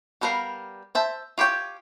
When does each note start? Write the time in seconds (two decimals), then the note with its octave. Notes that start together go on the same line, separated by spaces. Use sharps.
0.21 G3 B3 A#4 B4 F5
0.95 C5 E5 A5
1.38 F4 G4 C#5 G5